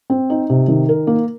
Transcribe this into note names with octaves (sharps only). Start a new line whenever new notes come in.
C4
D#4
C3
D#3
A#4
A#3